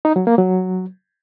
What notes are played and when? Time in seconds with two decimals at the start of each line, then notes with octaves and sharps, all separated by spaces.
0.05 D#4
0.16 F#3
0.27 A#3
0.38 F#3